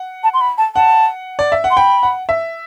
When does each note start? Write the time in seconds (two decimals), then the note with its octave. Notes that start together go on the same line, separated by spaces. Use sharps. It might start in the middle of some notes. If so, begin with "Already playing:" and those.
Already playing: F#5
0.24 A5
0.34 C6
0.41 B5
0.58 A5
0.75 F#5 A5
1.39 D5
1.52 E5
1.64 F#5
1.71 C6
1.77 G5 B5
2.03 F#5
2.29 E5